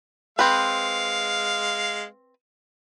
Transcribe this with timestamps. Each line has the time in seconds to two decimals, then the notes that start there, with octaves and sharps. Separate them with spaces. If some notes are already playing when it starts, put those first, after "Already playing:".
0.39 G#3 C4 B4 F5